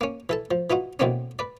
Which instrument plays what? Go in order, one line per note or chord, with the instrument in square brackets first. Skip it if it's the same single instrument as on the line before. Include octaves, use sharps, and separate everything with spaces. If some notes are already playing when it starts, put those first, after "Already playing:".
[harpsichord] A#3 C#4
E3 A4 A5
F3
E3 D#4 F4 F#4
B2 D3 E3 A#3 C4 C#4
B4 D5